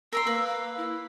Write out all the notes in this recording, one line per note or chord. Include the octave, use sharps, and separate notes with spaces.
A#4 A#5 C6 E6
A#3 B4
F5
E4